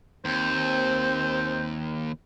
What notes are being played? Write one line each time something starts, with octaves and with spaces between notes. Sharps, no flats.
D#2 C4 C5